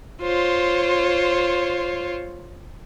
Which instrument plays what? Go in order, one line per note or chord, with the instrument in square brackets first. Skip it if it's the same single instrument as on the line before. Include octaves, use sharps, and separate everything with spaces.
[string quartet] F4 C5 C#5